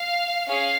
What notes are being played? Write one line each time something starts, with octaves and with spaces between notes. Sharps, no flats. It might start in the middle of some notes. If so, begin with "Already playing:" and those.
Already playing: F5
C#4 G#4 F5